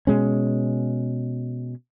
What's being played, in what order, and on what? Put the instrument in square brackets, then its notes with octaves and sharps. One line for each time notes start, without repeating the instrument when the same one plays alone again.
[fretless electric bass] B2 G#3 C#4